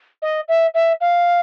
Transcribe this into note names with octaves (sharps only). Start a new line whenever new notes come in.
D#5
E5
E5
F5